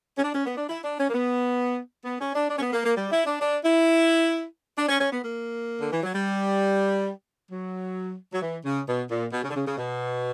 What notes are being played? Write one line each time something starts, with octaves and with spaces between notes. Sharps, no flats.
C#4
D4
C#4
B3
D4
E4
D4
C#4
A#3
B3
B3
C#4
D4
D4
C#4
B3
A#3
A#3
G3
E4
D4
D4
E4
D4
C#4
C#4
B3
A#3
D3
E3
F#3
G3
F#3
F#3
E3
C#3
B2
A#2
B2
C#3
D3
C#3
C#3
B2